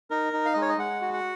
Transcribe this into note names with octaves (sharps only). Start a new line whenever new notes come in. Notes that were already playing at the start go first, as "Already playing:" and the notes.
D#4 A#4
D#4
F5
G#3 D#5
C#5
D#5
G#3 F#5
F#4
F#5